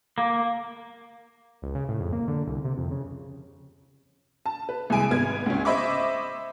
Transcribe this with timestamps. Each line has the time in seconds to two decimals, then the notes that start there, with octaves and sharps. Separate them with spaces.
0.18 A#3
1.62 C#2
1.75 C#3
1.88 A2
2.01 F2
2.13 A#3
2.28 D3
2.47 C2
2.65 C3
2.77 F2
2.91 C#3
4.46 A5
4.69 B4
4.90 C2 G#3 G#5 D7
5.11 G#1 B3 G#6
5.46 C#2 C#4
5.65 C5 D#5 E5 B5 C#6 D6